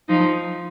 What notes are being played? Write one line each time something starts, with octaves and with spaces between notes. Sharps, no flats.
F3 D#4